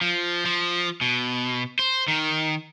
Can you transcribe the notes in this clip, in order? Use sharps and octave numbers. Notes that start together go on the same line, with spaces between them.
F3
F3
B2
C5
D#3